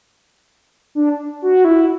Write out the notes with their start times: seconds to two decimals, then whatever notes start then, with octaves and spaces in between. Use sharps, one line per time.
0.95 D4
1.42 F#4
1.65 E4